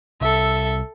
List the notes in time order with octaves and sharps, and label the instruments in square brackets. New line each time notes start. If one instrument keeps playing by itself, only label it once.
[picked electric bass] C2 [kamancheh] A4 E5